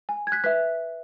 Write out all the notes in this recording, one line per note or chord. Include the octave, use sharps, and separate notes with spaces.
G#5
G#6
F#6 B6
B4 E5 F#6 B6